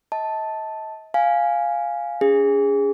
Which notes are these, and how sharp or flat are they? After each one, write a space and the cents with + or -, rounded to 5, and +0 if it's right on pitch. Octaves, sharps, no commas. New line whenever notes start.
D#5 +40 A5 +0
F5 +0 G#5 +0
C#4 +40 G#4 -20